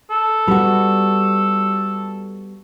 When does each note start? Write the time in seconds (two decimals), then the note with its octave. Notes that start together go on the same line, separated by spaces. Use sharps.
0.10 A4
0.48 G3 B3 F#4